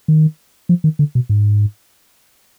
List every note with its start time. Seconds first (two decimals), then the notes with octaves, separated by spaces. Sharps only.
0.08 D#3
0.69 F3
0.84 D#3
0.99 D3
1.15 B2
1.29 G#2